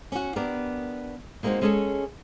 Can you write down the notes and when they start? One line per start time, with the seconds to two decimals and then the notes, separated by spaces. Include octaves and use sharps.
0.12 C#4 F#4
0.36 B3 D4 G4 A#4
1.43 G#3 A#3 C4 D4 D#4 F#4
1.62 G#3 C#4 G#4 A4 C#5